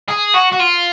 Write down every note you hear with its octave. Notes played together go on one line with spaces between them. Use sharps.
G#4
F#4
F#4
F4